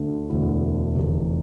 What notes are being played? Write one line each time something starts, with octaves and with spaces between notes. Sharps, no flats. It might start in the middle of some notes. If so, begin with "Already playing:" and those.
Already playing: D2 D3 A3
E1 D2 D3 A3 E4
F1 E2 C3